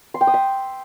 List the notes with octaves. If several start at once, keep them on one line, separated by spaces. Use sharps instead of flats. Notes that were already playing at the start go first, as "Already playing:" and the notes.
C6
G5
D#6
E5